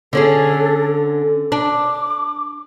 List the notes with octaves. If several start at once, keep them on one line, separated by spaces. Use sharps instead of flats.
D3 C#4 G#4 A4
D4 D6